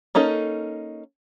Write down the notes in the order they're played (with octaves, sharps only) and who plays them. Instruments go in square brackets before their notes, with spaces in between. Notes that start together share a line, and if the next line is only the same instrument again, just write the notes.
[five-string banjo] A#3 C#4 D#4 A4